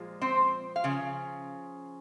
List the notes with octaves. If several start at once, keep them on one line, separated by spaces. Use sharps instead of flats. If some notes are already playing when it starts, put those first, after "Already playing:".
Already playing: A#2 F3 G#3
C4 C5
F5
C#3 F3